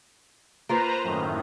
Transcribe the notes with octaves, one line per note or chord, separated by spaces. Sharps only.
A#3 F4 B4 C5 A#5
F#2 A2 D#3